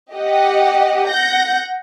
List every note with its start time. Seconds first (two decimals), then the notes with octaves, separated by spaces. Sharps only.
0.13 G4 D#5 F#5
1.09 F#5 G6 A#6